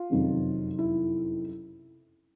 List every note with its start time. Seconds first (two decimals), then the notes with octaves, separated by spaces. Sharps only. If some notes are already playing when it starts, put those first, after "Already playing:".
Already playing: F4
0.10 F#1 F2 C3 D#3 F#3
0.79 E4